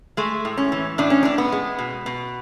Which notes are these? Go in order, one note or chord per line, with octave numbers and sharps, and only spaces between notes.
G#3 A3
A2
C#4
E3
A2 D4
C#4
A2 D4
B3
G#3
B2
B2